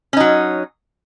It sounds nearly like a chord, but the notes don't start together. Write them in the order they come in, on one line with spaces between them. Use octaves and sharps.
C#4 D#4 F#3